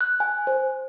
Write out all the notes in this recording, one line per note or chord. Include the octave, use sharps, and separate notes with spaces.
F#6
G#5
C5